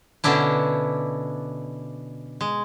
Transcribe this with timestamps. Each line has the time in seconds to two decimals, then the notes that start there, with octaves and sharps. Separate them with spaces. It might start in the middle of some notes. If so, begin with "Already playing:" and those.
0.24 B2 D3 C#4 D4 E4
2.41 G#3